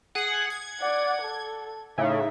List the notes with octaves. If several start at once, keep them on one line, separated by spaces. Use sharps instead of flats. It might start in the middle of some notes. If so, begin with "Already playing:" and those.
G#4 F#5
G#6
D5 F#5
A4
A2 C#3 D#4 E5